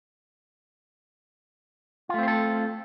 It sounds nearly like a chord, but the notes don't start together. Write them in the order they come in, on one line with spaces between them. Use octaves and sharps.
F4 A3 C4 C5 A4